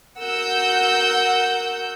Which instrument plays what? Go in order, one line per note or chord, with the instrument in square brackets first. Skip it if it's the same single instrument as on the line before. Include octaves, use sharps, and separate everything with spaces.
[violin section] F#4 A#4 F#5 E6 G6